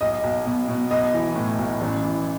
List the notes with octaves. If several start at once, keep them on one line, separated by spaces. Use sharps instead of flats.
B1 D#5
B1
B2
B2
B1 D#5
E3
A2
B1
A1
E3